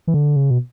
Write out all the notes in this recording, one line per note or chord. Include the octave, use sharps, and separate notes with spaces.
E3
D3
C#3
B2